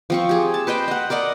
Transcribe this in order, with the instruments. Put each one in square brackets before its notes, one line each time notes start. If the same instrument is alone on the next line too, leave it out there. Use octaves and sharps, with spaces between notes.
[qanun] F3 C4 C#6
G4 G#4
A5
B4 C5 D#5 G5
D#5 F#5
A#4 D5 D#5 F#5